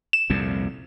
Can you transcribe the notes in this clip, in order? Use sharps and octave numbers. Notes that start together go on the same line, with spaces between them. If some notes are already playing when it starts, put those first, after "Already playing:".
E7
C2 F2 A#2